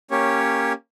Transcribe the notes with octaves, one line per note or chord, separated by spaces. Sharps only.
A#3 C#4 G4 C#5